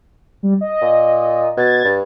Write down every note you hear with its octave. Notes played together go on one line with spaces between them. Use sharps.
G3
D#5
A#2
B2 G#6 A6
G2